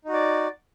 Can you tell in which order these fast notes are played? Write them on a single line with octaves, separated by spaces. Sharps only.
D#4 F#4 D5